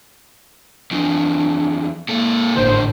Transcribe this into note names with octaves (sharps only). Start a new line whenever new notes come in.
E2 F3 D4
A#2 A#3 A4
G#1 A2 D3 D#3 C5